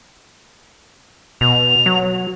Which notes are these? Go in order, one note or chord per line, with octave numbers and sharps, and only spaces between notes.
B2 F7
F#3